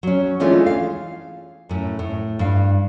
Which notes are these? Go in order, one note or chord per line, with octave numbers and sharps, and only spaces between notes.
F#3 C#4
E3 G#3 A3 C#4 D4 F4
F5
F#2 A2
A2
G2 F5